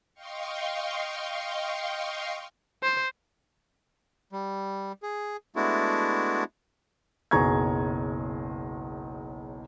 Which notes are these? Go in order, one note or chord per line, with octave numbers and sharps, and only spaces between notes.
D#5 F5 G5 C6 C#6
C5
G3
G#4
G#3 A3 B3 D4 E4 F#4
F#1 B1 G#4 A#5 C#6 G#6